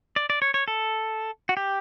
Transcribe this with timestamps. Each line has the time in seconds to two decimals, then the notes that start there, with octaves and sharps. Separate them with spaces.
0.16 D5
0.30 D5
0.42 C#5
0.54 C#5
0.68 A4
1.49 F#4
1.57 G4